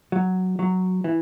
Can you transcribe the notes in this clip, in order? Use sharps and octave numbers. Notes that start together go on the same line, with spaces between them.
F#3
F#3
E3